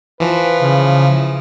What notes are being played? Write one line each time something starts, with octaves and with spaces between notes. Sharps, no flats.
E3 F3 B4
C#3